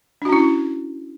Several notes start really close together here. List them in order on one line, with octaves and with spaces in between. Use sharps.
D4 F#4 C#4 E4